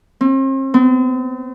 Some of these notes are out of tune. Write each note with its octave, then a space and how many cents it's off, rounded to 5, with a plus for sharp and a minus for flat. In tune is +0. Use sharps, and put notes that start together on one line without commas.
C4 +40
C4 -45